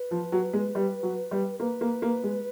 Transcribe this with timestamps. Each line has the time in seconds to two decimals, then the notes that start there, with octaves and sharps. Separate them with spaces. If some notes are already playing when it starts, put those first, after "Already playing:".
Already playing: B4
0.11 F3
0.32 F#3
0.53 G#3
0.75 G3
1.03 F#3
1.31 G3
1.60 A#3 B4
1.81 A#3
2.02 A#3
2.24 G#3